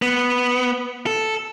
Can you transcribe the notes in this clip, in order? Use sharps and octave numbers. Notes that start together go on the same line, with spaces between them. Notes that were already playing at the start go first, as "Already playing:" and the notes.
B3
A4